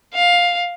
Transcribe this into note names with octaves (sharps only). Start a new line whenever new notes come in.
F5